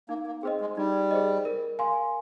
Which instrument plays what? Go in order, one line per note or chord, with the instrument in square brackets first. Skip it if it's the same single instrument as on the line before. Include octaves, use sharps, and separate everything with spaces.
[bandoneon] A#3 [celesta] D#4
[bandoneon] A#3
[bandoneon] C4 [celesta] G#4 C5 D#5
[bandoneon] G#3
[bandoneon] G3 [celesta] D#4
[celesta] G#4 C5 D#5
A#4
F5 G#5 C6